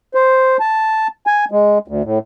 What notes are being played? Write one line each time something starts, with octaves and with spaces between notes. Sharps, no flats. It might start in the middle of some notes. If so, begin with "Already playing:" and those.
C5
A5
G#5
G#3
D2
A2